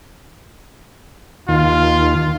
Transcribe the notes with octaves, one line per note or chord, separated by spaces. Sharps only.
D#2 F4